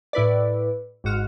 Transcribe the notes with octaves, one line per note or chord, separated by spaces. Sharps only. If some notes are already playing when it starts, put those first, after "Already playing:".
A2 E4 B4 D5
G#1 G#2 F#4 F6